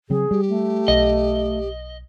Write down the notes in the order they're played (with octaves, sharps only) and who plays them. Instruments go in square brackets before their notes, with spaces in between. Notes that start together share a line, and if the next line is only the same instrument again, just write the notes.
[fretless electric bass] C#3 F#3 C4 [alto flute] G#4
[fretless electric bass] G3 [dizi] G4
[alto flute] A3
[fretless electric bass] B1 [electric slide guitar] D#5